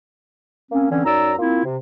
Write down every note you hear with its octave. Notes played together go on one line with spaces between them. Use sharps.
A#3 C4 C#4
D3 E3 C4 C#4
F#2 D#4 D5 A#5 E6
A#3 C4 E4 F4
C3